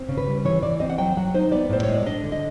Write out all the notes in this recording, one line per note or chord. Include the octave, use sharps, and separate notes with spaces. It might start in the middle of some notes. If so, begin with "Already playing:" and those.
Already playing: C4
C#3
B4
G3
E3 C#5
E3 D5
C4 D#5
F#5
F#3 G5
F#3 F#5
D#4 C5
B3 D5
A2 C5
C#5
G#3
D5
D4 D#5
D3
D#5